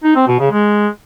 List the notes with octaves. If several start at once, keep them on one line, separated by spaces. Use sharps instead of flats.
D#4
C4
B2
C#3
G#3